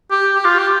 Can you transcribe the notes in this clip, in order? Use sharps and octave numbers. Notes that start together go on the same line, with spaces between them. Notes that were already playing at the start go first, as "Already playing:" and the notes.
G4
G4
F4
G4